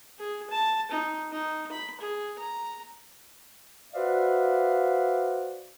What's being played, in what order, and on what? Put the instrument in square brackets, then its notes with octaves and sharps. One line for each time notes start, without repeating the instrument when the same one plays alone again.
[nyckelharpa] G#4
A5
D#4
D#4
B5
G#4
A#5
[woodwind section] F#4 B4 C5 D5 E5 F5